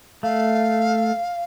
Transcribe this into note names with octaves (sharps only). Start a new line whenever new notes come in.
A3 F5